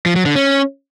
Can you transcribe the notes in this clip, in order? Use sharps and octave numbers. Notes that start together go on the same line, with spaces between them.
F3
F#3
D3
C#4